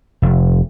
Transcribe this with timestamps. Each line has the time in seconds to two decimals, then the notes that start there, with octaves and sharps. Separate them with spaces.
0.22 F1